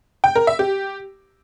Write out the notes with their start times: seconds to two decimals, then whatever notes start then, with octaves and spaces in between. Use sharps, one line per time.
0.24 G5
0.36 A#4
0.47 E5
0.59 G4